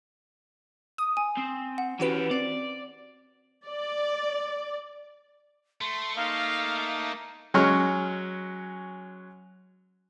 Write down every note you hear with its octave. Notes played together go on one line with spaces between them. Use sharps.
D#6
G#5
C4
F#5
E3 C#4 F#4 G4 B4
C4 D5
D5
A3 C6
A#3 D#4 F5
F#3 G#3 C#4 C#6 F6